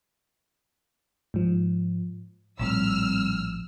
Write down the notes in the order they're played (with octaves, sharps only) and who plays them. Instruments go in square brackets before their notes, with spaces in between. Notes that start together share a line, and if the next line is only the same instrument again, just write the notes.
[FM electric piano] G#2 F3
[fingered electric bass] A#1 A2 F3 [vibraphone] G3 C4 [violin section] E6 F6